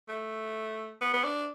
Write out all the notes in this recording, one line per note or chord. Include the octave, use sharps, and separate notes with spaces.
A3
B3
B3
D4